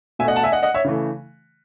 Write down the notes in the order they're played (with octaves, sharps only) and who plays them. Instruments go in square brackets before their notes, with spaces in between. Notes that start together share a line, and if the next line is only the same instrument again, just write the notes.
[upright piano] B2 E5 G#5
A3 D#5 F#5
F#5 A5
E5 G#5
D#5 F#5
D#5 F#5
C#5 E5
C#3 E3 A3